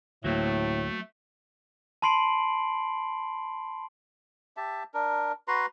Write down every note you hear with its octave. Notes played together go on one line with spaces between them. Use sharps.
D2 A2 F#3 A3 A#3 C4
A5 B5 C6 C7 D7 F#7
G4 E5 A5
D4 A#4
F#4 B4 A#5 C6